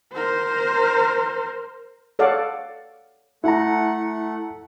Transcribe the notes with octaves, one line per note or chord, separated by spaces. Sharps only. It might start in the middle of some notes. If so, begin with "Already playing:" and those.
A#4 C5
A4 C#5 D5 F5 F#5
A3 E4 F#5 A#5